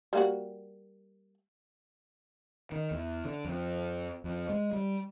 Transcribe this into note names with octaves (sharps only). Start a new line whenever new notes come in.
G3 A#3 F#4
D#3
E2
D3
F2
F2
G#3
G3